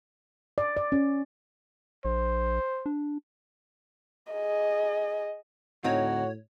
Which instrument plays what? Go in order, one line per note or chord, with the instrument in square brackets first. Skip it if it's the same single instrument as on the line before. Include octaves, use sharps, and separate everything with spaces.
[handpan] D5
D5
C#4
[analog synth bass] A#1 [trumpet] C5
[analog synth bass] D4
[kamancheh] G#4 D#5
[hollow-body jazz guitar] D2 C4 D#4 [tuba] A2 [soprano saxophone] F#4 [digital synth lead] C#5